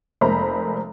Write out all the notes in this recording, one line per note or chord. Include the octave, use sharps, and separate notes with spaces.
F1 G#3 A#3 C5 A#5 B5